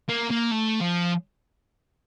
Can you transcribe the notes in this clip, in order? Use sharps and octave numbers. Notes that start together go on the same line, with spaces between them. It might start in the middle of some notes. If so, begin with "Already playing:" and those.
A#3
A#3
A3
F3